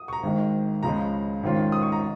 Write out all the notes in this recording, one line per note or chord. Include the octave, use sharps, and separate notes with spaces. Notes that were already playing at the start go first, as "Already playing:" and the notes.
Already playing: D#6
C#6
A#5
G#1 G#2 D#3 G#3
C#2 C#3 F3 G#3 A#5
G#1 G#2 D#3 C#4 F4
D#6
C#6
A#5